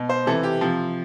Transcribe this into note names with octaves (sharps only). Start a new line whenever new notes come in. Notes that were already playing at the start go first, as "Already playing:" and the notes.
Already playing: B2
C5
C3 E3 A4
G4
C3 F3